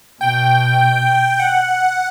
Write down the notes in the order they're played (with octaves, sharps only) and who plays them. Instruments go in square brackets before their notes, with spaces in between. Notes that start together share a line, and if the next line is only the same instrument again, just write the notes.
[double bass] B2 [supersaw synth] G5
[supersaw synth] F#5